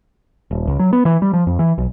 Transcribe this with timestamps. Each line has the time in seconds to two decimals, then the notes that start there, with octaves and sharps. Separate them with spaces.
0.51 D#1
0.67 C#2
0.79 F#3
0.93 B3
1.05 E3
1.22 G3
1.33 F3
1.47 F2
1.59 E3
1.78 B1